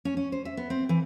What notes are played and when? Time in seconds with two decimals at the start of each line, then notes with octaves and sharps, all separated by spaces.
0.05 C#4
0.17 C#4
0.32 C5
0.45 E5
0.57 B3
0.70 C4
0.89 E3